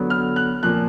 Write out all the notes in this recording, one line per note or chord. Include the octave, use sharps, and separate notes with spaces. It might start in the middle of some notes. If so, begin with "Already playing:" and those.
Already playing: D3 F#3 B3
F6
F#6
A#2 F3 A#3 F#6